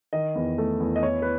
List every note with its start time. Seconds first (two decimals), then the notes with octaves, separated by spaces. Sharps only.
0.13 D#3 D#5
0.35 E2
0.58 A3
0.80 E2
0.96 D#5
1.03 E3 C#5
1.22 B4